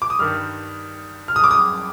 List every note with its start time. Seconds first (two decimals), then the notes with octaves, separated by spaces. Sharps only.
0.02 D6
0.10 D#6
0.19 G2 D#3 G3 F6
1.28 F6
1.36 D#6
1.44 D6
1.51 D#6